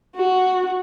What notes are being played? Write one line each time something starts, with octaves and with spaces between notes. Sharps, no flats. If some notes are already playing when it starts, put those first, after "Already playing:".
F#4